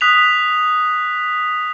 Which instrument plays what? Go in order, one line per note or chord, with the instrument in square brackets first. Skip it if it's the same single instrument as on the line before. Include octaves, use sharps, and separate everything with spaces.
[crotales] D#6 F#6 B6 F7